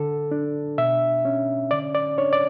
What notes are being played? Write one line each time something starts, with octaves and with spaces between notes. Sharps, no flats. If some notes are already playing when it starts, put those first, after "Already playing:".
Already playing: D3 A4
D4
B2 E5
C#4
D3 D5
D5
D4 C#5
D5